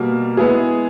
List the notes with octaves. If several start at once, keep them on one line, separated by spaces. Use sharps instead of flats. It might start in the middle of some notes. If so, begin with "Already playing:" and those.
Already playing: B2 G3 A#3
G#3 B3 E4 G#4